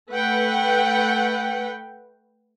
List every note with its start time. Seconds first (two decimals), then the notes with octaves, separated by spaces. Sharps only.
0.11 A3 B4 F#5 G5